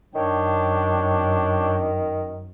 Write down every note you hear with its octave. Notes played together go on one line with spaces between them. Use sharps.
F#2 D#3 D4 C#5 G5